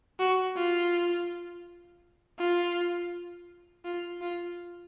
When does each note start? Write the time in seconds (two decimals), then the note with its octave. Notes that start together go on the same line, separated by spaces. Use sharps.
0.19 F#4
0.56 F4
2.39 F4
3.85 F4
4.21 F4